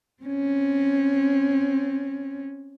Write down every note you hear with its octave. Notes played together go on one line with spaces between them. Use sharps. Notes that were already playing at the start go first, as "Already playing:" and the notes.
C4 C#4